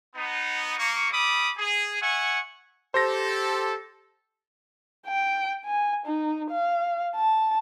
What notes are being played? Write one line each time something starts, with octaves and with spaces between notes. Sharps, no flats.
B3 D#4
A#3 C#6
G3 B5 D6 D#6
G#4
E5 F#5 G#5 C#6
G4 A4 C5 A#6
G5
G#5
D#4
F5
A5